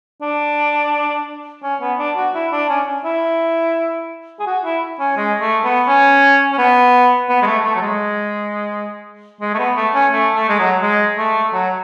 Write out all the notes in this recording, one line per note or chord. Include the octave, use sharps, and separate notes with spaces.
D4
C#4
B3
D4
F#4
E4
D4
C#4
E4
G#4
F#4
E4
C#4
G#3
A3
B3
C#4
C#4
B3
B3
G#3
A3
A3
F#3
G#3
G#3
A3
B3
A3
C#4
A3
A3
G#3
F#3
G#3
A3
F#3